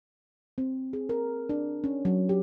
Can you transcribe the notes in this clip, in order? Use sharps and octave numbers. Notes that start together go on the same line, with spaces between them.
C4
G#4
A#4
D4
C#4
F#3
G4